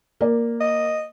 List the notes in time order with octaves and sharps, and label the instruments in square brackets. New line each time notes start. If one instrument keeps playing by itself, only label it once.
[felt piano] A#3 D5
[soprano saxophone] D#5